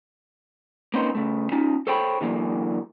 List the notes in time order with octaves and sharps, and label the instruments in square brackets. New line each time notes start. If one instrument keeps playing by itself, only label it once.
[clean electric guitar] A#3 C4 C#4 D#4 B4 C5
C#3 A3
C#4 D#4 F4
A4 C5 C#5 G5 A#5 B5
D3 E3 F#3 A#3